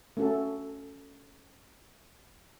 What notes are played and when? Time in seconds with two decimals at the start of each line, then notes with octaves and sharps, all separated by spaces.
0.17 A3 C#4 F#4 A4